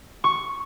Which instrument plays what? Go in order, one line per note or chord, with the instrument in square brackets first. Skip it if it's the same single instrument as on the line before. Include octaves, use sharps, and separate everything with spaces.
[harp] C#6